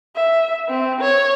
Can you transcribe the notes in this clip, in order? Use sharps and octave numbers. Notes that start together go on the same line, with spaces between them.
E5
C4
C#5